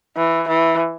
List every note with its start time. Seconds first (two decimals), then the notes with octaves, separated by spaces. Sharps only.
0.16 E3
0.48 E3